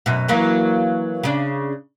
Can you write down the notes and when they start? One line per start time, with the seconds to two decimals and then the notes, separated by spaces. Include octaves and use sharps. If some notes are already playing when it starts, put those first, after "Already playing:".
0.06 F#2 B2
0.28 E3 F#3 A#3
1.23 C#3 D4